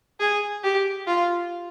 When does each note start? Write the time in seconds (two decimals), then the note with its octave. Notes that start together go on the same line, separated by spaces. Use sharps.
0.20 G#4
0.64 G4
1.07 F4